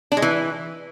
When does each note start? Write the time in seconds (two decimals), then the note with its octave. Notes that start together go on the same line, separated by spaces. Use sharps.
0.12 D4
0.17 G#3
0.22 E3